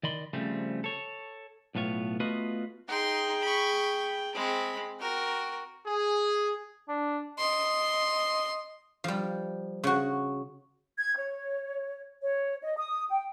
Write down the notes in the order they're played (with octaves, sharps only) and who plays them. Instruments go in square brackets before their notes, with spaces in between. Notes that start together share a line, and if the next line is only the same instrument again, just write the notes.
[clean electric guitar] D#3 D5 D#5 B5 C6
C#3 F3 G3 A3 C4
A4 C#5
B1 A2 B3 F4 C#5
A3 B3 F4 F#4 B4 D#5
[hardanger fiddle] D#4 C6 [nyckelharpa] G#4 G5
[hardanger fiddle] B5 C#6
[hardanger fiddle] G#3 C4 [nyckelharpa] B5
[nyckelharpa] F#4 [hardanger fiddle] A#4 G5
[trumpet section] G#4
[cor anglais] D4
[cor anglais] D#5 [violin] C6
[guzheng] F3 G3
C#3 F#4
[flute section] G#6
C#5
C#5
D#5
D#6
G5